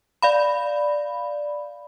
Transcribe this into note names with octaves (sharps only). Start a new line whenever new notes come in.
D5 F5 B5